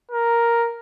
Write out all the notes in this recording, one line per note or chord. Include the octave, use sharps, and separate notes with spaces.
A#4